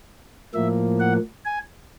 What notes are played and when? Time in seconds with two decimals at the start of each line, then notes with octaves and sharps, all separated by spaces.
0.54 A2 F3 A#3 E5
1.00 F#5
1.45 G#5